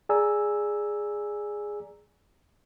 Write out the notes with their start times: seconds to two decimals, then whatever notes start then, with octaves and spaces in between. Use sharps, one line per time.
0.09 G#4 D5 G#5 A#5 E6